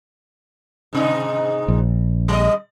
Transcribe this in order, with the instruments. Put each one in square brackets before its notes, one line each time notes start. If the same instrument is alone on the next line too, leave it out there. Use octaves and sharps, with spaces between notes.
[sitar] G#2 C3 D#4
[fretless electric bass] A#1
[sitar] G3 D5 D#5